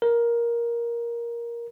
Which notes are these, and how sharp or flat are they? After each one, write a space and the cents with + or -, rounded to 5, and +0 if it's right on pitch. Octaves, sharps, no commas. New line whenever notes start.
A#4 +10